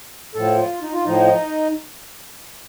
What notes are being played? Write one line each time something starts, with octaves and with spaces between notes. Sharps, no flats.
A2 F3 A4
F4
D#4
F4
A2 F3 D#4